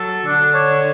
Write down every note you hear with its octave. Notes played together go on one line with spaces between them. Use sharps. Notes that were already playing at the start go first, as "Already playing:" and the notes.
Already playing: F#3 A4
D3 D4
C#5